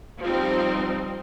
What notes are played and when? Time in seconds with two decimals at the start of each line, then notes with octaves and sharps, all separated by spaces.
0.21 F3 G3 C4 D#4